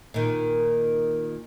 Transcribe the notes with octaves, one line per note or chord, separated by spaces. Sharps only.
A#2 D#3